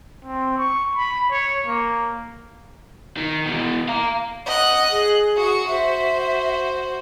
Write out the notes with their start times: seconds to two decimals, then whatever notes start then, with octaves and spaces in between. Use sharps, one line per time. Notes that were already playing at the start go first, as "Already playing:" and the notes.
0.25 C4
0.58 C#6
0.96 B5
1.31 C#5
1.67 A#3
3.17 D#3
3.46 B2 E3
3.88 F5 A#5
4.46 D#5 F#5 F#6
4.91 G#4
5.36 F#4 C#6
5.67 F#4 C5 E5